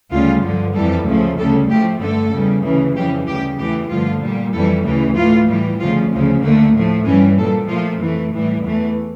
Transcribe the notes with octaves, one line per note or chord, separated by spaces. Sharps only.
D2 C#3 G3 F4
G2 D3 F3
F2 E3 G3 A4
D2 C#3 F3 A3
D2 C#3 G3 A4
A2 F3 A3 G4
G2 D3 A3 A4
E2 C#3 G3
D2 C#3 E3 A3
F2 C#3 E3 G3 G4
D2 C#3 G3 G4
E2 E3 A3 G4
G2 D3 F3 A3 F4
A#2 G3
F2 E3 G3 A4
D2 C#3 E3 A3
A2 E3 A3 F4
A2 E3 G3
D2 C#3 F3 F4
D2 C#3 F3
D2 D3 A3 A#3
A2 F3 A3
G2 E3 G3 C#4
A#2 G3 A4
A#2 F3 A3 F4
F2 E3 A3
A2 E3 G3
E2 E3 A3